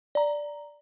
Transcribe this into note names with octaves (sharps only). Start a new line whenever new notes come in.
D5 A#5